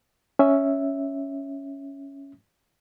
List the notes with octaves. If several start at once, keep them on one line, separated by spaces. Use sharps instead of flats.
C#4 E5